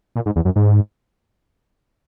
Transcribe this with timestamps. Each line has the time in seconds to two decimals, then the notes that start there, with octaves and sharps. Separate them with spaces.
0.16 A#2
0.26 G#2
0.36 E2
0.45 F#2
0.56 G#2